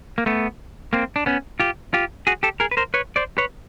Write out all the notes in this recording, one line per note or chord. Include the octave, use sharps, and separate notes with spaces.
A#3
A3 B3
A#3 C4
D4
B3 C#4
F4 G4
F4 G4
F#4 G#4
G4 A4
G#4 A#4
B4
A#4 C5
B4 C#5
C5 D5
B4 C#5